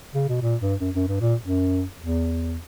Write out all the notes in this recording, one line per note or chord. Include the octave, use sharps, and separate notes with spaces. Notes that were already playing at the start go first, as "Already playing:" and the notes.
C#3
B2
A#2
G2
F#2
F#2
G2
A#2
F#2
E2